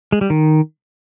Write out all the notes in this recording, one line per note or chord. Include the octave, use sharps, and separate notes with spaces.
G#3
G3
D#3